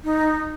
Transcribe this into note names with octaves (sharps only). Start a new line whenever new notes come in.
D#4